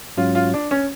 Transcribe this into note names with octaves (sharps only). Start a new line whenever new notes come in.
G#2 F#3 C#4 F4
F4
D4
C#4